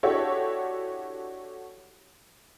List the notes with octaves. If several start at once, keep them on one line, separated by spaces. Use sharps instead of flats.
D4 E4 F#4 G4 A4 C#5